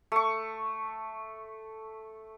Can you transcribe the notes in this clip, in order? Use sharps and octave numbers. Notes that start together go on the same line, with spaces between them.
A3 C#6